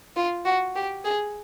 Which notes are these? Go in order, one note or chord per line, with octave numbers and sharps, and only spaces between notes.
F4
F#4
G4
G#4